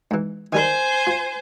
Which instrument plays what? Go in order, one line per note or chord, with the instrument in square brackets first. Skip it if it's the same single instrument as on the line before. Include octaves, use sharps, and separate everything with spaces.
[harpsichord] G#2 E3
[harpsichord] D#3 G3 A#4 [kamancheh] C5 G#5
[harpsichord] F4